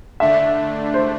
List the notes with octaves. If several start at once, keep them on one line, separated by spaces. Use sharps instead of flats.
D3 A3 D4 E5
C5